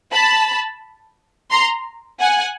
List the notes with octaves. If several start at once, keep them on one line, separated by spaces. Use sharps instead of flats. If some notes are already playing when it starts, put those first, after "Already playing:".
A5 B5
A#5 C6
F#5 G#5